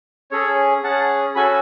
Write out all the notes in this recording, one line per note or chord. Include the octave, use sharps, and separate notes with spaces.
C#4 G#4 A4 C#5
C#4 G#4 F#5 A5
C#4 F#4 A4 G#5 B5